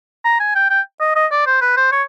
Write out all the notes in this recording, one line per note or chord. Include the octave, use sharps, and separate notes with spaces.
A#5
G#5
G5
G5
D#5
D#5
D5
C5
B4
C5
C#5